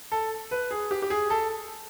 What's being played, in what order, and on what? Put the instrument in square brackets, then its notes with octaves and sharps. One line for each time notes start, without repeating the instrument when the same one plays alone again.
[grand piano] A4
B4
G#4
G4
G4
G#4
A4